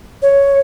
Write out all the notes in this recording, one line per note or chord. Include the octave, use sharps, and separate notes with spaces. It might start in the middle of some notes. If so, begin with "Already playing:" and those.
C#5